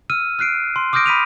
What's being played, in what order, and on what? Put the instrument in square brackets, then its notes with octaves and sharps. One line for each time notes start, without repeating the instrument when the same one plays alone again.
[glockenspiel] E6 F6 D#7
F6 F#6 C7 D7
C6
D6 D#6 F6 G6 A#6 D7
B5 B6 D#7 F7